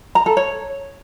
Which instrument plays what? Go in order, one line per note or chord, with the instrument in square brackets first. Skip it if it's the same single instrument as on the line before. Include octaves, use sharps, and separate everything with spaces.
[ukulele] A#5
A4
C#5